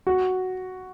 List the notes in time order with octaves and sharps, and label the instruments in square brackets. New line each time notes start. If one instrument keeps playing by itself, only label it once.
[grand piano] F#4